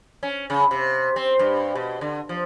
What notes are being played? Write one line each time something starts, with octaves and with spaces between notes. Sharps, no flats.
C#4
C#3
C3
C4
G2
B2
D3
F3